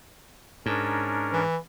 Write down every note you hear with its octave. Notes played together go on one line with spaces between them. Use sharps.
G#2 C#4 D4 A#4
E3